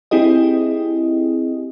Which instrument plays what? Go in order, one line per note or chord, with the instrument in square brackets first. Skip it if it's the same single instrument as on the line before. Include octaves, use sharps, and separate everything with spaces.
[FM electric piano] C4 E4 G4 G#4 D#5